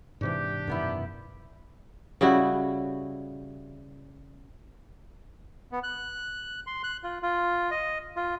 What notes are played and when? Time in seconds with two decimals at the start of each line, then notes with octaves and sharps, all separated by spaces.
0.21 G#2 C3 E3 D4 G4
0.67 F#2 B2 D#3 B3 E4
2.21 C#3 G3 E4 F#4
5.72 B3
5.83 F#6
6.67 C6
6.83 F#6
7.03 F4
7.22 F4
7.71 D#5
8.16 F4